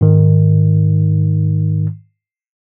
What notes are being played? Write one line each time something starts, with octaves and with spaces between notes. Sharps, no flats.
G#2 D#3